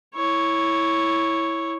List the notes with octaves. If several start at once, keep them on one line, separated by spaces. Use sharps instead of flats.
E4 C#5